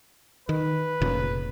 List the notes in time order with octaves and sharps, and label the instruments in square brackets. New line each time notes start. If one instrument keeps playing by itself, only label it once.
[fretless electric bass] D#3 [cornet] B4
[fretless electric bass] F1 A#2 C#3